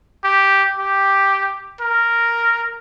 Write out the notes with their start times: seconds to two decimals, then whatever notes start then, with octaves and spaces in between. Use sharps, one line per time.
0.24 G4
0.79 G4
1.81 A#4